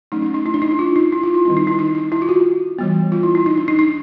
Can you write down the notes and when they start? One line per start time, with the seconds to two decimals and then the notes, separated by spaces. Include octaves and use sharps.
0.12 F#3 A3 C#4 D#4
0.22 D#4
0.34 D#4
0.46 E4
0.54 D4
0.62 D#4
0.71 E4
0.79 F4
0.96 D#4
1.12 E4
1.23 F4
1.34 E4
1.45 D#3 G3 C4 E4
1.57 D#4
1.67 E4
1.79 D#4
1.95 D#4
2.12 E4
2.22 F4
2.29 F#4
2.78 E3 G3 B3
3.12 F4
3.23 E4
3.35 E4
3.46 D#4
3.57 D4
3.68 D#4
3.79 D#4